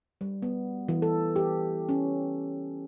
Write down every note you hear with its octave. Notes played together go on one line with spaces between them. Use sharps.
G3
B3
E3
A4
G4
C#4